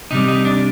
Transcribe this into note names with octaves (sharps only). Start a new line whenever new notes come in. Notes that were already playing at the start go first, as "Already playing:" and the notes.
C3 G3 D#4
D#4
D4